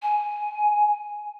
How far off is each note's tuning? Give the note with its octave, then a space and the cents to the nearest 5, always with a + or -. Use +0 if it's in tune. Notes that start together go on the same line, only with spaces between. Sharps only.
G#5 +5